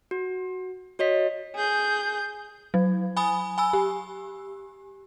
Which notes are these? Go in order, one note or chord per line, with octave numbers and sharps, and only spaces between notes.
F#4
F#4 C#5 D#5 B6
G#4 G6
F#3
G#5 B5 D#6
G#5 B5 E6
G4